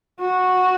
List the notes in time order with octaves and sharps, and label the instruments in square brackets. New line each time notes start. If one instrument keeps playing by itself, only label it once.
[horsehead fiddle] F#4